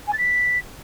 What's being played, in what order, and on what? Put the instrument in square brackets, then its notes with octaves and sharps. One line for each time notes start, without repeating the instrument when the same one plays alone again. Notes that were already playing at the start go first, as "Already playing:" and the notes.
[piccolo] G#5
A6
B6